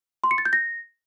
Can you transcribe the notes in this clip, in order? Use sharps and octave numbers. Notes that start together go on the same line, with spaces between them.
C6
C#7
A6
G6
A#6